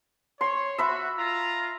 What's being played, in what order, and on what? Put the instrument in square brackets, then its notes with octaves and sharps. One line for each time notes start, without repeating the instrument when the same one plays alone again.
[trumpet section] C#5 [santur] C6
[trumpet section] F#4 [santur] E5 B5
[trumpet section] F4 A#5